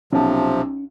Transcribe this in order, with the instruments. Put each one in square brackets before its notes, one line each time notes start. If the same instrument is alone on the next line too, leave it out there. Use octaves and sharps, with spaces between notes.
[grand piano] B1 A5 [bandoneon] C3 F3 [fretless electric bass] C#4